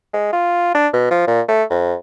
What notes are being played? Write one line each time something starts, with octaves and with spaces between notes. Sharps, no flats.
G#3
F4
D4
B2
F3
A#2
A3
F2